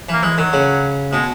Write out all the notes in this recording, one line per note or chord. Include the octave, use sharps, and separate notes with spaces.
E3 A#3
E3 G#3
D#3 F#3
C#3
B2 G#3